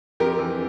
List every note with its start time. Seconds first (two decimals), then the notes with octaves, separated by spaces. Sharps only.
0.20 F2 G4 A#4
0.39 E3